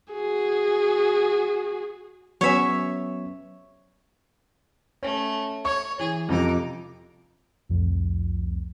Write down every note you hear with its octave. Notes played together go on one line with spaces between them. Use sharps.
F#4 G#4
F#3 B3 C#4 C#5 E5
A3 C#4
C#5 C#6
E3 G#4
F2 C3 F3 D#4 D6
C2 F2 A2